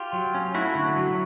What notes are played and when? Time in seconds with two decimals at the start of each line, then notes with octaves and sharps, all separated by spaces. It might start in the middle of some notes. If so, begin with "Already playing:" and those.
Already playing: F4 G4
0.13 F#3
0.34 C#4
0.54 A3 E4 F#4
0.75 D3
0.96 F#3